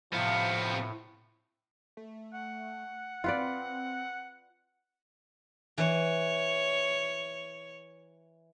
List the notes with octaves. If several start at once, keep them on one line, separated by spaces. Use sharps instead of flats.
A2 C3 F3 B3
A3
F#5
C4 F4 B4 D5
E3 C#5